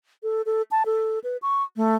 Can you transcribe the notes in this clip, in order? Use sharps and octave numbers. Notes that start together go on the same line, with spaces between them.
A4
A4
A5
A4
B4
C#6
A3